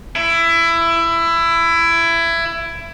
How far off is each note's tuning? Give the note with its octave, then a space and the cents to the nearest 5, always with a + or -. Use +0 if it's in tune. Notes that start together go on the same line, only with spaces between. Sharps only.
E4 +20